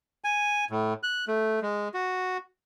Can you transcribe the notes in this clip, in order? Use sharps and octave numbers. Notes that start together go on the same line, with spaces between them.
G#5
A2
F#6
A3
G#3
F#4